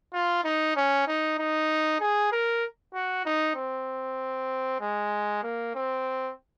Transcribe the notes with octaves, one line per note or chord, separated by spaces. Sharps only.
F4
D#4
C#4
D#4
D#4
G#4
A#4
F#4
D#4
C4
G#3
A#3
C4